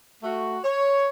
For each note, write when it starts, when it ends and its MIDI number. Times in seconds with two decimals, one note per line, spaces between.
0.23 0.58 57
0.23 0.58 66
0.64 1.09 73